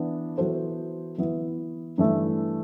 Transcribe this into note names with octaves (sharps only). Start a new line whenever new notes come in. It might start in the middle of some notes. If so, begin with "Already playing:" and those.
Already playing: E3 B3 D4
E3 B3 F#4 A4 C5
E3 B3 E4
G2 E3 A3